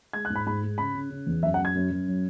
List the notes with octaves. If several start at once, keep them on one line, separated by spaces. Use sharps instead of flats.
G#3 G#6
F#6
G#2
B5
G#2 B5
G#3
C#3 B5
C#3
C#3
E2
F#2 E5
F#5
F#2
G#6
F#2
F#2
F#3